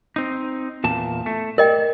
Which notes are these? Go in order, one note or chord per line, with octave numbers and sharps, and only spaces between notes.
C4 D#4
E2 A#2 A5
A3
A#4 D5 D#5 G5